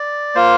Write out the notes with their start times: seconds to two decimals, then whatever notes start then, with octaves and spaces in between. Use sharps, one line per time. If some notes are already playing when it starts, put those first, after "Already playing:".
Already playing: D5
0.35 A#3 F4 C5